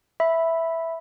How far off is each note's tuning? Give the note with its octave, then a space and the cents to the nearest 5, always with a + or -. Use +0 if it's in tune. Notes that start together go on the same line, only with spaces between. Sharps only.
E5 +0 B5 +0